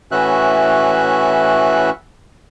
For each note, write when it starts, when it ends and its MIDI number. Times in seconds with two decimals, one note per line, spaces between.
0.12 1.90 45
0.12 1.90 52
0.12 1.90 61
0.12 1.90 66
0.12 1.90 76
0.12 1.90 90